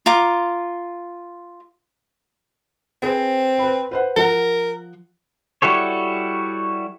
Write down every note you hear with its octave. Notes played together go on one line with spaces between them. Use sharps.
F4 A#5 D6
C4 G#4 B4 C5
B4 B5
B4 C5 F#5
F3 A#4 F#5
G3 E4 F#4 A4 C#5